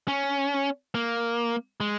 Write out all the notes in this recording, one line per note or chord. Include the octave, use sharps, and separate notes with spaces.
C#4
A#3
G#3